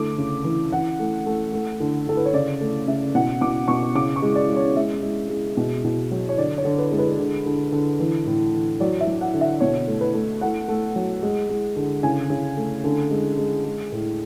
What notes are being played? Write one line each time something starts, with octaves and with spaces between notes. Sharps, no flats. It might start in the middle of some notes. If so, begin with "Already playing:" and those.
Already playing: D3 A3 D6
C#3
E3
E3 F#5
A3
A3
A3
D3
D3 A4
B4
C#5
C#3 D5
A3
C#3 E5
B2 F#5
B2 D6
B2 C#6
C#3 D6
C#6
G#3
D5
G#3
C#5
G#3 E5
G#3
G#3
B2
B2
F#3
C#5
D3 D5
C#5
D3
B4
G#3
B4
D3
D3
D3
E3
A2
E3
F#3 D5
E5
F#3
F#5
D3
E5
B2 C#5
A3
B4
A3
A3 F#5
A3
F#3
G#3
G#3
D3
C#3 G#5
C#3
A3
D3
G#3
G#3
G#3
A2